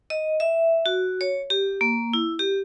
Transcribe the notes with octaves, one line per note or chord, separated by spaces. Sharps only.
D#5
E5
F#4
C#5
G4
A#3
E4
G4